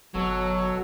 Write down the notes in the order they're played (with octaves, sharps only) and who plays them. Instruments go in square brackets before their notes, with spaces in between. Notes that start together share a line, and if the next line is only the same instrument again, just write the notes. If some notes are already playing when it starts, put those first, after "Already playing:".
[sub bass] G1 [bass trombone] B2 [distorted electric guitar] F#3 [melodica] A4 C#5